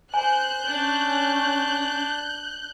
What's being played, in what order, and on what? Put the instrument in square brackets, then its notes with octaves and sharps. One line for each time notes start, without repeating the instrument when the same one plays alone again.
[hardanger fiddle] C5 [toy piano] G#5 [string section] F#6 G6
[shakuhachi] C#4 [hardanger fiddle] D4